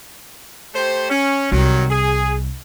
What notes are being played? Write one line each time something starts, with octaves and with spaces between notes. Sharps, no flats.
A3 G4 C5
C#4
C2 D#3 F#3
G#4